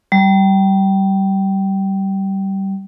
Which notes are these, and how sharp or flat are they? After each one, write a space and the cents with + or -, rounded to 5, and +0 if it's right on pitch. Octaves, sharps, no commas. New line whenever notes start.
G3 -20